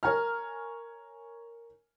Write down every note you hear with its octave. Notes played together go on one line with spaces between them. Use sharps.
A#4 C#5 G#5 A#5 F6